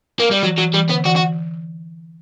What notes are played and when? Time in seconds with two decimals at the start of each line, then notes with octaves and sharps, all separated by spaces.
0.20 A#3
0.31 G3
0.43 E3 F#3
0.58 E3 F#3
0.74 E3 G3
0.90 D3 B3
1.06 E3 F#4
1.16 F#4